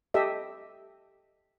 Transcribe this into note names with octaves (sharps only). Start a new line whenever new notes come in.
G4 A4 D#5 E5